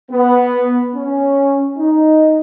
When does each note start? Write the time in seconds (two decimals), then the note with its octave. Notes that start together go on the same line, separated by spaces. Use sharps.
0.11 B3
0.95 C#4
1.78 D#4